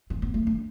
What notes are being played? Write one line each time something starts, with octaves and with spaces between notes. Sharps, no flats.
C4
B3
A3
D4